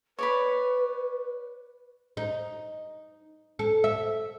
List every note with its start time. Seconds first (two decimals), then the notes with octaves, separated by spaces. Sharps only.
0.19 B4 C#5 D5 B5
2.17 D#4
3.59 A4
3.84 E5